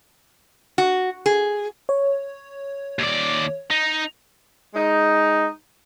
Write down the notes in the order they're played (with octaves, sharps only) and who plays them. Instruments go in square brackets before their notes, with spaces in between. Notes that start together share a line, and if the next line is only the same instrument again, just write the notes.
[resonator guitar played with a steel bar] F#4
G#4
[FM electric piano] C#5
[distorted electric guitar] D#2 D5
D#4
[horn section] G#3 D#4